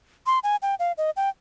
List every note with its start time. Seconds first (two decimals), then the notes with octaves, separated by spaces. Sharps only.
0.26 C6
0.43 G#5
0.62 G5
0.79 F5
0.98 D#5
1.17 G5